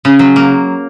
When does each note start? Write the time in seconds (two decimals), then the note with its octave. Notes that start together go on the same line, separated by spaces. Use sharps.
0.05 C#3
0.19 F#3
0.36 A#3